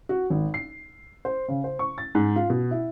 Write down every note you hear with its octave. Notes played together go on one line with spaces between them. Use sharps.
F#4
G#1
C7
C5
C#3
C5
C#6
A6
G#2
F4
B2
E4